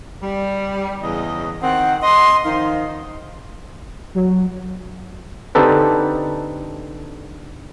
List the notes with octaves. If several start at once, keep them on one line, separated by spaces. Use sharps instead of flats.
G3
E2 C#3 D#5
D#3 C4 F#5
D#5 C6
D#3 F3 D#4 F5
F#3
D3 C4 D#4 G4 A4 B4